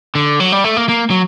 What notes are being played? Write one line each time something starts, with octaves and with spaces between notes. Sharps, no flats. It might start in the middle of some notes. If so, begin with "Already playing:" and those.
D3
F#3
G3
A3
A#3
A#3
F#3